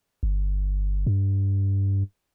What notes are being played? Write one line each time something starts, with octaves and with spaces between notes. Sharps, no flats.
G1
G2